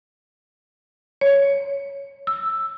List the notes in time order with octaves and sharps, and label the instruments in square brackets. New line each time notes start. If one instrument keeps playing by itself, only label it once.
[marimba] C#5
E6